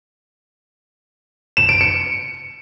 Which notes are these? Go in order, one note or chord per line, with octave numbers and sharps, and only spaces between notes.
E7
D7
C#7